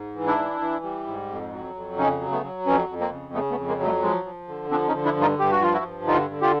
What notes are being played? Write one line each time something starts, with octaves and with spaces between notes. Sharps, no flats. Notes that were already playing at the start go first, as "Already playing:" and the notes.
Already playing: G#2
E3
D4 E4
E3
E3
G3
G#2
F2
F#3
F2
C#3 C#4 D#4
F#3
A3 B3
F#3
F2 B3 C#4
F2
A#3 C4
C#3
C#3 A3 B3
A3 B3
F2
G#3 A#3
F#3
G3 A3
F3 G#3
F3
D3
F3 C4 D4
C#4 D#4
D3
D4 E4
G2
D#4 F4
G2 G4
F#4
F3 F4
E4 F#4
G2
D3 D#4 F4
D3
F4 G4